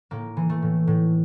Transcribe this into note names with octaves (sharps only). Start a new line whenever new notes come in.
A2 A#3
E3
A3
A2
A2